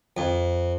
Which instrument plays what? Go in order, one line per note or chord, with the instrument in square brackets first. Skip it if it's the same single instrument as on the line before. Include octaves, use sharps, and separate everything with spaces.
[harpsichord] F2